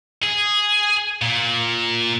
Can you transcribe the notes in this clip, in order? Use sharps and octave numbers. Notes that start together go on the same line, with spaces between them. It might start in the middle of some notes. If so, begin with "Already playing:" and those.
G#4
A#2